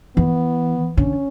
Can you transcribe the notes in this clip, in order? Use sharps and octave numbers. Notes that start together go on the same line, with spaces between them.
E3 B3
D3 C#4